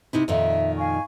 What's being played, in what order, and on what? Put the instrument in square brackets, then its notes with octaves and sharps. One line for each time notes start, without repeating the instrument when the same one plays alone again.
[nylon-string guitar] C3 D#4 E4
[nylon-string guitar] F2 A#2 D#3 [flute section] E5
[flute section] F5 G#5 C#6